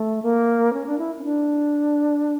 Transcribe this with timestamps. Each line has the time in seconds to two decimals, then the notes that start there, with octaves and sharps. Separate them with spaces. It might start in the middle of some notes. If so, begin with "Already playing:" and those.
Already playing: A3
0.23 A#3
0.73 C#4
0.87 D4
0.98 E4
1.19 C#4
1.24 D4